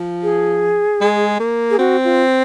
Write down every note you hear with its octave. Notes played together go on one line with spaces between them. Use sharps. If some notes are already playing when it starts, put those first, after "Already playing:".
Already playing: F3
G#4
G#3
A#3
G#4
C4 F#4
F4